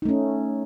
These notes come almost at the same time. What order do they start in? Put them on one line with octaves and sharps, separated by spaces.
D#4 A3 C#4